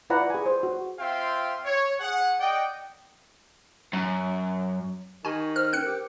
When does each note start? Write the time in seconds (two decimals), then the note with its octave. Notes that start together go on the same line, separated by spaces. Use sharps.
0.10 E4 F4 B4 D5 F#5 A#5
0.30 G#4 G#5
0.46 C5
0.63 F#4
0.99 C4 F4 E5 F5 G5 C6
1.65 C#5
1.99 G#4 F#5
2.39 D5 D#5 F#5 G5
3.93 F#2
5.25 D#3 G4 G#5 C#6
5.56 C5 F6
5.73 C#4 A#4 F#6 C#7
5.86 G4